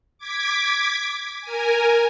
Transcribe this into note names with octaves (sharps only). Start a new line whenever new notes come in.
D6 G#6 B6
A#4 G#5